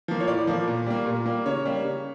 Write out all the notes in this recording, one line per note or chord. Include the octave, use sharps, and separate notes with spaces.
F3 A#3
C#5
A2 D5
F3 A#3
A#2
G3 A#3
A#2
G3 A#3
C#3 C#5
G3 A#3
C#3